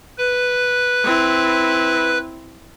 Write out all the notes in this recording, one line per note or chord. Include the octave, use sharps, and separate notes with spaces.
B4
C4 E4